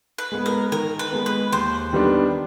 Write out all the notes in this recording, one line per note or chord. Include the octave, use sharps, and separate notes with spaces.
B4
G#3 B3
A#4
D#3 A#4
B4
G#3 B3
B4
D#2 C5
D#3 G3 B3 D4